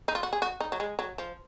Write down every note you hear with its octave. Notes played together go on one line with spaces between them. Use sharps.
D#4
F4
F#4
G#4
F#4
D#4
F#3
G#3
F#3
F3